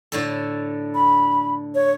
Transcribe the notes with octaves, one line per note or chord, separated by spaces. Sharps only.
A2 D3 A4
B5
C#5